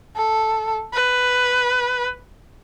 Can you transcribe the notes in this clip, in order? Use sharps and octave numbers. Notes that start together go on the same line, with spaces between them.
A4
B4